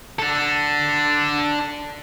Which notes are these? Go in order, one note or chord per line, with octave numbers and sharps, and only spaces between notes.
D4 A4